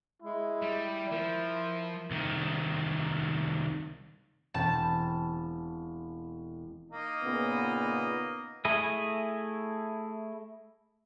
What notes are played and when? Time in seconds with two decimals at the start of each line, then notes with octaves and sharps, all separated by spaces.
0.22 G#3 E4
0.62 G3
1.11 F3 A#4
2.11 C2 D#3
4.54 E1 C4 A5 B5
6.91 A#3 D#4 D#5
7.23 A#2 C#3 B3
8.65 A3 E4 G#4 D#5